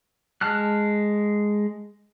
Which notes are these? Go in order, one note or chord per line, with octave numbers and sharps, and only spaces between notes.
G#3 A5 F6 F#6